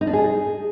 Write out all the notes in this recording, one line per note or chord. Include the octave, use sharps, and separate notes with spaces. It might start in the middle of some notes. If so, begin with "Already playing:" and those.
D#4
D4
G#4